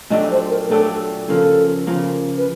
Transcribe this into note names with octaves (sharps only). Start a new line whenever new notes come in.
A#2 F#3 A3 D4 G4 D#5
C5
A#4
A#2 F#3 A3 D4 G4 A4
C#3 F3 A#3 A4
C#3 F3 A#3
B4